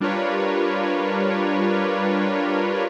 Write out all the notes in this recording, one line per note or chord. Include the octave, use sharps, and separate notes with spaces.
G3 D4 F4 A#4 B4 C#5